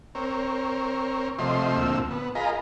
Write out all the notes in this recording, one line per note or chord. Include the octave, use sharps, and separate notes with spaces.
C4 A#4 C#5
C3 F3 A3 C5 D#5 C6
D2 A#2 F3 C4 E6
B3
F4 G#4 A#4 D#5 A#5 B5